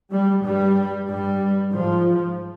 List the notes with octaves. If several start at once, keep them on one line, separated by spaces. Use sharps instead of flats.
G3
G2 G3
G2 G3
G#2 F3